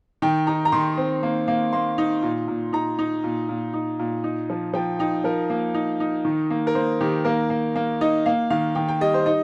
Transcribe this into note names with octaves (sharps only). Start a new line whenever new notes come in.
D#3 G5
D#4 A#5
A#5
D#3 C6
C4
A#3
A#3
A#3 C6
D#4
A#2
A#2
D#4 A#5
D#4
A#2
A#2
D#4
A#2
D#4
F3
F3 G5
D#4 G5
F3 A#4
A#3
D#4
D#4
D#3
A#3
A#4
A#3 C5
D#3 G4
A#3 A#4
A#3
A#3
D#4 D#5
A#3 F5
D#3 F5
D#3 G5
G5
G3 D#5
C5
D#4 D#5